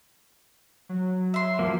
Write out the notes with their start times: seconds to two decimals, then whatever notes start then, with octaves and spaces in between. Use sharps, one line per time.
0.89 F#3
1.34 E5 C6
1.59 F3 A#3